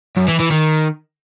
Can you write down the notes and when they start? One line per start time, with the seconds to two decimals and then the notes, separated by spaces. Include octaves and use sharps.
0.17 F#2
0.28 E3
0.40 E3
0.51 D#3